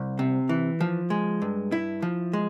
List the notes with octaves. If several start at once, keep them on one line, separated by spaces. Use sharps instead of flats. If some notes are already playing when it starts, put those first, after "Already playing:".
Already playing: C2
C3
E3
F3
G#3
G2
E4
F3
G#3